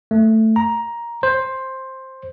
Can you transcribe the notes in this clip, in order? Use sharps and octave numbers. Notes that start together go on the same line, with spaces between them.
A3
A#5
C5